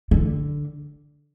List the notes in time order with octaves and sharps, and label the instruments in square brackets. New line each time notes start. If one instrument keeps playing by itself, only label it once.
[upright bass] D3